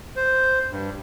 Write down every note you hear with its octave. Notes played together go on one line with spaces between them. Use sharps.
C5
G2